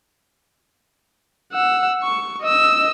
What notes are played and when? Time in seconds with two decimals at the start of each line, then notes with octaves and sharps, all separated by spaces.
1.52 F#5 E6
2.03 C#6
2.42 D#5 E6